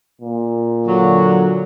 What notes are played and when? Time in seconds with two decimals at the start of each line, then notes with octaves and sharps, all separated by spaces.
0.21 A#2
0.86 D3 F#3